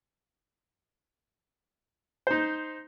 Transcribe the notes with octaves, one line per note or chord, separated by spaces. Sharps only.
D#4 C5